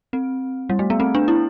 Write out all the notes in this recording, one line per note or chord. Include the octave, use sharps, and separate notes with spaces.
C4
G3
A3
B3
C4
D4
E4